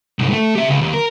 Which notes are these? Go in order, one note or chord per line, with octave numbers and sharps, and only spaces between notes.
C2 G#2
A3
G4 E5
C#2
D#2
A#4